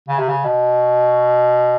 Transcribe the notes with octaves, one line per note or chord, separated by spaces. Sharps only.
C#3
C3
C#3
B2